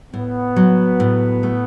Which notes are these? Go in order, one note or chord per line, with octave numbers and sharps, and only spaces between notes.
A2 B3
F#3
A2
A3